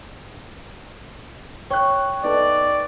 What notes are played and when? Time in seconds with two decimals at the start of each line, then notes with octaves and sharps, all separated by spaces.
1.70 C#5 G5 C#6 F#6
2.24 B3 D#4 A4 D5